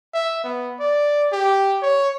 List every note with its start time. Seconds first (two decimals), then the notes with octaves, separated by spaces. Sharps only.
0.14 E5
0.44 B3
0.80 D5
1.32 G4
1.82 C#5